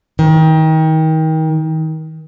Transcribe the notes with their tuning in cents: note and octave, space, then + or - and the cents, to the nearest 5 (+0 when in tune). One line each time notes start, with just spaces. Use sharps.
D#3 +30